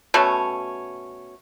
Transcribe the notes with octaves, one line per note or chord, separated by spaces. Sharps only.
B2 A3 C#4